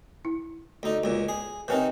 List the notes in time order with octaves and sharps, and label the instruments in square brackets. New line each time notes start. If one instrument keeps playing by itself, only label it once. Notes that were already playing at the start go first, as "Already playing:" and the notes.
[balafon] E4
[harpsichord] D2 D#4
[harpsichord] C#2 A#2 [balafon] F#4
[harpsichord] G#4
[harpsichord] C3 C#4 D#4 [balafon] C4 A#4 B4